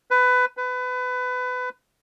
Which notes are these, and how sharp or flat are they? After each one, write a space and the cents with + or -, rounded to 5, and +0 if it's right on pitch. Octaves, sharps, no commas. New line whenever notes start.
B4 +20
B4 +25